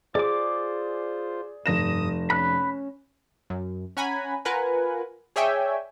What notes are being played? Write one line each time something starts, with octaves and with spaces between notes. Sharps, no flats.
F4 G#4 C5 D5 D6
F1 G2 D#6 A#6 E7
C#4 B5 F#6
F#2
C#4 F#5 G#5 A#5 B5
F4 A#4 B4 F#5 G#5
G#4 C#5 D5 E5 G5 G#5